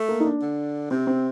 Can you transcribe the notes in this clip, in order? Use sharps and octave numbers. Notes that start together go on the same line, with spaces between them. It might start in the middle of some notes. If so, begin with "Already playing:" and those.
Already playing: A3
A#3
D#4
D4
D3
C3 C4
C4